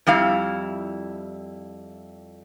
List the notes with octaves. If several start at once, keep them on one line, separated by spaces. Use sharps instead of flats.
F2 G3 E4 F5